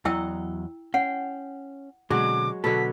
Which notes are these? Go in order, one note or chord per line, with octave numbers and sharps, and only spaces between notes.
E2 F#3 E4 D#5 G5 E6
C#4 F#5 G5
B2 D3 F#3 G#3 C4 F#4 D6
B2 D3 F#3 A4 B6